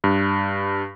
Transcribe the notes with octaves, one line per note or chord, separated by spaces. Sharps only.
G2